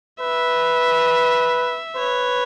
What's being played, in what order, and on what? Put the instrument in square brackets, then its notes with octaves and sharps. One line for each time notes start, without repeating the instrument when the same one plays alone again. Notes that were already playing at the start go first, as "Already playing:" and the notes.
[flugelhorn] B4 [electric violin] E5
[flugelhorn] B4 [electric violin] C#5